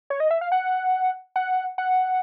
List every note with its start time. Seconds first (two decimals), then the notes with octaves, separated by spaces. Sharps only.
0.10 C#5
0.20 D#5
0.31 E5
0.41 F5
0.52 F#5
1.36 F#5
1.78 F#5